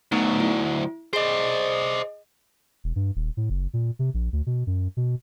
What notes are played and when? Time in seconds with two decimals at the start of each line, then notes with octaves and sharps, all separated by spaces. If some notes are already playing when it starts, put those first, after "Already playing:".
0.12 D2 F#3 A3 B3 D#4
0.40 E4
1.13 G#4 C5 D5 D#5
2.84 E1
2.96 G2
3.16 D#1
3.37 A2
3.50 F#1
3.73 A#2
3.99 C3
4.14 A#1
4.33 D2
4.46 B2
4.67 F#2
4.97 B2